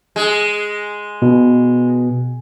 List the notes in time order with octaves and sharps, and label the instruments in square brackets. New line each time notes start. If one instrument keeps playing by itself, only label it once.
[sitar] G#3
[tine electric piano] B2